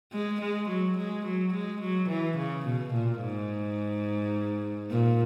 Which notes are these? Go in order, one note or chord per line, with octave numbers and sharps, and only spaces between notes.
G#3
G#3
F#3
G#3
F#3
G#3
F#3
E3
C#3
B2
A#2
G#2
A#2